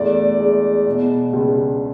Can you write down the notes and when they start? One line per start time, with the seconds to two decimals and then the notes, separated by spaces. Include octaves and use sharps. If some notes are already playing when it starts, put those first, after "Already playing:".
Already playing: E2 A3 D5
0.40 G#3
0.86 B2
1.33 C#2